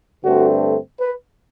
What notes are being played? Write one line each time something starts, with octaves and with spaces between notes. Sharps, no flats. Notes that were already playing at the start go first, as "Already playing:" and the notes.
G2 D3 A3 C4 F#4
B4